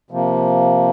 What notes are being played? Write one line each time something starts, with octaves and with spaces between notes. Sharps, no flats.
C3 F3 A#3